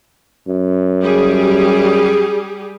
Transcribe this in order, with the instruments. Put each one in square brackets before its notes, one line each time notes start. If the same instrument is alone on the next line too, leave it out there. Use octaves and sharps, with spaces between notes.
[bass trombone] F#2
[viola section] G3 G4 G#4